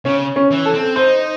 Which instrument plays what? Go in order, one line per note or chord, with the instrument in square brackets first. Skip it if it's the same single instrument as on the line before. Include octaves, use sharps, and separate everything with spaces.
[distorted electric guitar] C#3 [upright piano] C#4
[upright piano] C#4
[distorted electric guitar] E3
[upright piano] A4
[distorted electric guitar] C4
[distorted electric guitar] D#4 [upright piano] C5